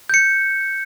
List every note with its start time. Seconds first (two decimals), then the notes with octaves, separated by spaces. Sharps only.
0.10 G6 C#7